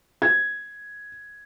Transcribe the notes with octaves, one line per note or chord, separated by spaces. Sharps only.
G#6